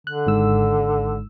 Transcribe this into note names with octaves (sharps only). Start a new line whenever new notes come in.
D3 F#6
G#1 G#2 E6